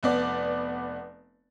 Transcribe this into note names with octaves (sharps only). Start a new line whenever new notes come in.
F1 B3 D5